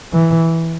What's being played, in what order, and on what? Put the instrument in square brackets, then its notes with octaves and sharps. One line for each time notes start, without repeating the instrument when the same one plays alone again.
[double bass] E3